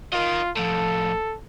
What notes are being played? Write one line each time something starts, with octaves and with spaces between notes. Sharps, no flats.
F4 A#4 D#5
A2 F3 A4